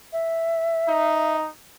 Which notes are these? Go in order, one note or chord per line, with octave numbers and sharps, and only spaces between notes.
E5
D#4